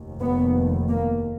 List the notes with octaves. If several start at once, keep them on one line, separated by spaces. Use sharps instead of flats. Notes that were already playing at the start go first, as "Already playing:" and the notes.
Already playing: F1 D#2
B3
A#3